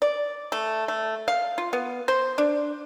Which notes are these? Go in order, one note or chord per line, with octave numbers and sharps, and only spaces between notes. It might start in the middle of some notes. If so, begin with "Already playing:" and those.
D5
A3
A3
F5
F4
B3
C5
D4